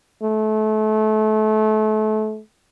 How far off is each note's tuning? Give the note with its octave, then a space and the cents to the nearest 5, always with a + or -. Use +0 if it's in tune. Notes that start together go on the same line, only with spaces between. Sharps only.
A3 -30